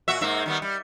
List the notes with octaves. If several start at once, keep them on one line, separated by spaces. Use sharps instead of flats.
A#2 F#4 E5
G#2 A#3 E5
D#3 G3 B3
G3